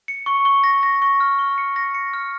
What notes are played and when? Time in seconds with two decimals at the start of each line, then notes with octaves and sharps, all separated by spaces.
0.08 C#7
0.26 C#6
0.45 C#6
0.64 A#6
0.83 A#6
1.02 C#6
1.20 F6
1.39 C#6
1.58 C#7
1.76 A#6
1.94 C#7
2.14 F6